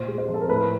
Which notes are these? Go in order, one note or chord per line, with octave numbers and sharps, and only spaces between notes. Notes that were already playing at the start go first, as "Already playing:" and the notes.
Already playing: A#2 C5
G#3
C5
F3
A4
A#4
A2 B4